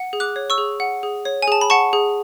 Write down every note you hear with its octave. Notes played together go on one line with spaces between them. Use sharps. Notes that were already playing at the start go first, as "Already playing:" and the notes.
Already playing: F#5
G#4
D6 F#6
C#5
C#6 E6
G#4
F#5
G#4
C#5
G#5
G#4 A5
B5
F#5 A5 C#6
G#4